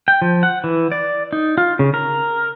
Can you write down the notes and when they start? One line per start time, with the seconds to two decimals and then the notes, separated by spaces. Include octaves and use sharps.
0.08 G5
0.22 F3
0.43 F#5
0.64 E3
0.92 D5
1.33 D#4
1.58 F4
1.79 C#3
1.94 A#4